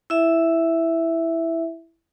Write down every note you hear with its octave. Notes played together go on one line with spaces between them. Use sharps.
E4 E5